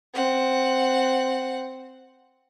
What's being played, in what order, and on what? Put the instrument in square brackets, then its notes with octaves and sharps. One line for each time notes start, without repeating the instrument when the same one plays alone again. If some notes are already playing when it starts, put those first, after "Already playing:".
[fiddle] C4 F#5